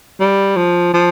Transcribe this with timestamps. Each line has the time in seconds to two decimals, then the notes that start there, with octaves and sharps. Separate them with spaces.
0.20 G3
0.57 F3
0.94 F3